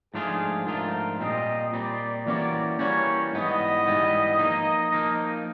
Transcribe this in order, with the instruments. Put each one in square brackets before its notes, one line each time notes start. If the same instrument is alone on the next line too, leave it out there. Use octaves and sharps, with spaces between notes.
[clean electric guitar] G#2 F3 A3 D4 F4 [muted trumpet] G#4
[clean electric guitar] G#2 F3 A3 D4 F4 [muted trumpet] A#4
[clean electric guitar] A#2 G3 C4 [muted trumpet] D#5
[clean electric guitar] A#2 G3 C4 [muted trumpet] D5
[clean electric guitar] E3 G3 A#3 C#4 F#4 [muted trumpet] D5
[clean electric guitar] E3 G3 A#3 C#4 F#4 [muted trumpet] C#5
[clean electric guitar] G#2 E3 G3 B3 [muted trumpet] D#5
[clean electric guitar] G#2 E3 G3 B3
F3 A#3 D#4
F3 A#3 D#4